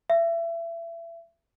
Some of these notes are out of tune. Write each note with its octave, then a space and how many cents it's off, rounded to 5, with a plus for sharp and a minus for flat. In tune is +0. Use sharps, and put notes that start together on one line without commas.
E5 +30